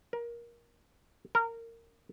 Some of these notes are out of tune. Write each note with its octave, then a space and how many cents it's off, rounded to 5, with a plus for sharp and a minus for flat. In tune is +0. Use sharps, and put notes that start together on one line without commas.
A#4 +20
A#4 -20